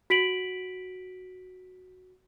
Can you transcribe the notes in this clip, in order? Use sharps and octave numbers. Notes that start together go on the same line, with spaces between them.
F#4 B6 D7 F#7